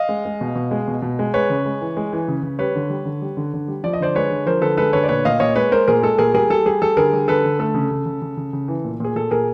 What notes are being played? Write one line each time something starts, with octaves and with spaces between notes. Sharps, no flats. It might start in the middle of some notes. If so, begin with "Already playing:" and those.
Already playing: D#5 F5
G#3
G#3
B2
B2
G#3
B2
B2
G#3
G#3 B4 C#5
C#3
G#3
E3
G#3
E3
C#3
C#3
G3 B4 C#5
D3
G3
D3
G3
D3
D3
G3
F3 D5
D#5
D3 C5 D5
G#3 B4 C#5
D3
F3 A#4 C5
D3 A4 B4
G#3 A4 B4
D3 B4 C#5
D5
A#2 B4 C#5
A#2 D#5 F5
A#2 C#5 D#5
G#3 B4 C#5
G#3 A#4 C5
A#2 G#4 A#4
G#3 A4
A#2 G#4 A#4
G3 G#4 A#4
G3 A4
G3 G#4
G3 A4
D3 G#4 A#4
G3
D3 A4 B4
D3
A3 A4
C#3
C#3
C#3
C#3
C#3
C#3
E3
A#2
A#2 G#4
A#2 A4
A#2 G#4 A#4